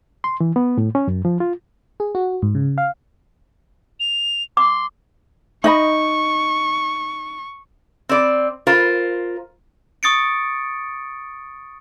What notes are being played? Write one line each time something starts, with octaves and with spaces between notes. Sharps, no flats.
C6
E3
B3
A2
C#4
F#2
F3
F4
G#4
F#4
G#2
C#3
F5
F7
C6 D6
D#4 D#5 B5 C#6
C4 D5
F4 A#4 C5
C#6 D#6 A6 C#7 D7